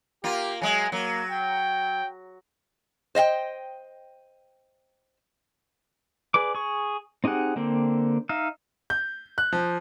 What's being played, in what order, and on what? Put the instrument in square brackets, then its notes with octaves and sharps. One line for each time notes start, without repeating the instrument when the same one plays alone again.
[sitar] A#3 F4 [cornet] G4
[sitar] F#3 G#3 [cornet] G#5
[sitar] F#3 [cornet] A#3
[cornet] G5
[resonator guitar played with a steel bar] C5 D#5 F5 G5
[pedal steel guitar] G#4 B4 D5 D6
G#4 C#6
C4 D#4 G4 G#4 F#5
D3 A#3 C4
D#4 E5 F5
[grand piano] G6
F#6
F3